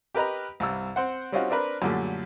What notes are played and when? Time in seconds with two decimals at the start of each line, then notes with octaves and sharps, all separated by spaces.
0.15 G4 A#4 B4 D#5 A#5
0.60 C2 G2 E6
0.96 C4 C5 F#5
1.32 G3 C4 C#4 D#4 F4 F#4
1.50 C4 D4 A#4 B4
1.82 F#2 A#2 D3 G3 A3